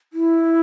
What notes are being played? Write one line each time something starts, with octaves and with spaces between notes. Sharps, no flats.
E4